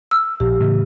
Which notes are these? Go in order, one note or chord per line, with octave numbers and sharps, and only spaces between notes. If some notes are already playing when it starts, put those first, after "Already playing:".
E6 F6
A#1 G4
A2 C#3 E3